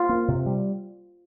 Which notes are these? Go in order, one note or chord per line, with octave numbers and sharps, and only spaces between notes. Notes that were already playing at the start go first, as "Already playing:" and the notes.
Already playing: F4
A#3
C3
G3